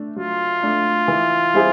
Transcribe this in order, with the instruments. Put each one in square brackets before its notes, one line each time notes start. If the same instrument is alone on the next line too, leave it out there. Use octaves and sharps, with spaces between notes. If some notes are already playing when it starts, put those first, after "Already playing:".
Already playing: [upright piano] A3 D4
[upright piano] F#3 [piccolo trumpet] F4
[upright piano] A3 D4
E3
G3 C4 E4 G#4